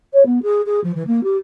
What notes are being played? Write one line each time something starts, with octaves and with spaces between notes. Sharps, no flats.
C#5
B3
G#4
G#4
F3
E3
A#3
G4